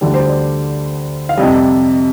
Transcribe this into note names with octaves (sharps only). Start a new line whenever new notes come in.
D2 D3 G3 D5
C5
D5
F5
F2 C3 G3 D#5